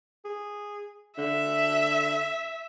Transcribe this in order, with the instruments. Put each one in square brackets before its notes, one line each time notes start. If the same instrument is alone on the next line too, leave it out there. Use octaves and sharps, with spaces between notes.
[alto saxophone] G#4
[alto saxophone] D3 [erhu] E5